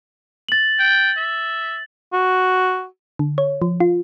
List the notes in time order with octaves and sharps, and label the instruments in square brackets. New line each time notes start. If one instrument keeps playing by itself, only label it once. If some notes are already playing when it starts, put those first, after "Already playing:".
[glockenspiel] A6 F#7
[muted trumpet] G5
E5
[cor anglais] F#4
[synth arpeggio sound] D3
C#5
F3
F4